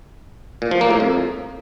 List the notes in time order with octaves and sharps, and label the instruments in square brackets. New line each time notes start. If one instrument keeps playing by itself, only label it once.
[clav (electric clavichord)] A#2
F3
A#3
A2
F2